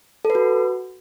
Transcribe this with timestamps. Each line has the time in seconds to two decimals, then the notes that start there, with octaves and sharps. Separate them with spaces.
0.25 A4
0.30 B4
0.35 F#4